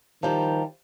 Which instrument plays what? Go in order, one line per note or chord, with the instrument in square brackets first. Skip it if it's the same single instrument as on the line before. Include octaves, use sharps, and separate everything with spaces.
[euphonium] D#3 [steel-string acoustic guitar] F3 G3 [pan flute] A#5